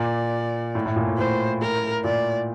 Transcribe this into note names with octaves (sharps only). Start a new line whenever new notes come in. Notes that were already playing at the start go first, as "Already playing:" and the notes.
Already playing: A#2 D5
A2
A2
A#2
A2
A2 C5
A#4
A#2 D5